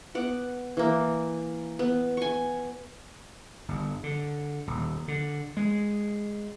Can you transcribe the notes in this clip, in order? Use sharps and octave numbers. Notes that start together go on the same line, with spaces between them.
B3 F#5 D6
E3 A#3
B3
G#5 C#6
G1
D3
D#1
D3
G#3